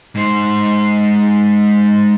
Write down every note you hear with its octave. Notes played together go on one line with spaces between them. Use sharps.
G#2 C5